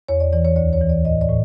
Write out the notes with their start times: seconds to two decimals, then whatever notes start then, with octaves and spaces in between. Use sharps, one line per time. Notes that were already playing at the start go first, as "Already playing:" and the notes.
0.09 E2 C#5
0.20 D5
0.33 E3 D5
0.45 C#5
0.56 D2 D5
0.73 C#5
0.81 E3
0.89 D5
1.05 A2 D#5
1.21 D5
1.29 A2